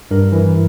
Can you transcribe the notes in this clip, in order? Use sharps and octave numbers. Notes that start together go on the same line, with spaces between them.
G2 A#4
E3